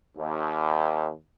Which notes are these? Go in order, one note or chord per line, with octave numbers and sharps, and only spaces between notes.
D#2